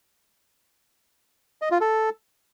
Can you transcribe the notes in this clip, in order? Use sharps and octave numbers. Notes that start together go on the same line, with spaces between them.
D#5
F4
A4